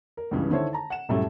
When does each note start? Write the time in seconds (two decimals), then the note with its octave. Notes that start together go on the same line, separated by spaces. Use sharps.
0.17 A#4
0.31 C#2 G2 C#3 E3
0.51 D3 D#3 E4 A4 C5 C#5
0.73 A5 A#5
0.90 F#5 E7
1.09 C2 F#2 A2 G3 A3